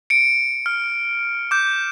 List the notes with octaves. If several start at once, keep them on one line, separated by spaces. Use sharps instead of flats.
C#7 D7
F6
D6 G6